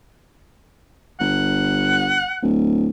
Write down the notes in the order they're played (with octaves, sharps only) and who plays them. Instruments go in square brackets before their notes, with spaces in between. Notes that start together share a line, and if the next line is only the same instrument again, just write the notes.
[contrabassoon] G1 [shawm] F#5
[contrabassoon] D1